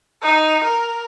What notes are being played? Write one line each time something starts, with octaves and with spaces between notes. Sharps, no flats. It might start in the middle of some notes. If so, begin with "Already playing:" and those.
D#4
A#4